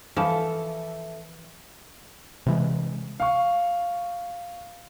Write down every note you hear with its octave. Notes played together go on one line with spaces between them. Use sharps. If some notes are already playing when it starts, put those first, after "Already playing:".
E3 F3 A4 E5
C3 E3 G#3
F5 C#6